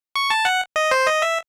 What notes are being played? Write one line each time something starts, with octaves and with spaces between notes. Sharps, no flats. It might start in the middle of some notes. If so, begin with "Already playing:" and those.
C#6
A5
F#5
D#5
C5
D#5
E5